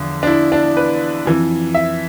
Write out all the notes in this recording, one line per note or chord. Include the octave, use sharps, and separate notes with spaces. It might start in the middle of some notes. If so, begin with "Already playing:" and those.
Already playing: E2 D3 F3
D4
E4
D4
B4
F2 E3
E5